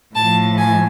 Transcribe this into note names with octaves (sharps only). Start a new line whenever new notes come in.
A2 F3 A5
G#5